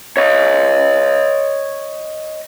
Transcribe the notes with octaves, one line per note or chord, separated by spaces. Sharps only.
C#5 D#5